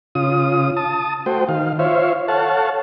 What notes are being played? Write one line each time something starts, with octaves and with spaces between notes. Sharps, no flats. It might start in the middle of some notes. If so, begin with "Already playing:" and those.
C#3 F4 D#6
A5 D#6
A3 F#4 C5 G5
D#3 F5
F4 C5 C#5 E5 F5
A4 C#5 F5 F#5 A5